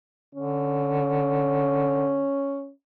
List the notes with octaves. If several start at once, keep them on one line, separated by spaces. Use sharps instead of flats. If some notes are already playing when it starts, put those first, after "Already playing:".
D3 C#4